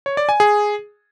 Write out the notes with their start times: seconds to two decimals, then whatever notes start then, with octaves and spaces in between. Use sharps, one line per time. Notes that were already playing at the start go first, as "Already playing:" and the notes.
0.06 C#5
0.17 D5
0.29 G#5
0.40 G#4